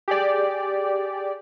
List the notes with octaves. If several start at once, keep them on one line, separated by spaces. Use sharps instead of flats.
G4 G#4 D5